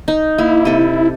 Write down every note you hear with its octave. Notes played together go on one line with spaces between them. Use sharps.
D#4
A#3 E4
C3 A4